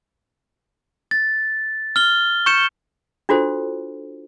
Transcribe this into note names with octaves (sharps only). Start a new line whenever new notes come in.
A6
F6 G7
C#6 G6 C#7 E7
D4 F4 F#4 A4 C5